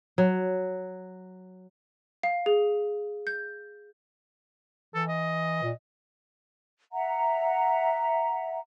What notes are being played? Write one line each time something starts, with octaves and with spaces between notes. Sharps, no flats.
F#3
F5
G#4
G6
E3 A4
D#5
A#2
E5 F#5 A#5